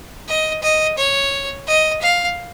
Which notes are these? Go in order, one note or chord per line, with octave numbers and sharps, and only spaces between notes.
D#5
D#5
C#5
D#5
F5